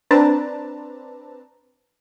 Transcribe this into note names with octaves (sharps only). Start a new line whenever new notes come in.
C4 D4 B4 A5 A#5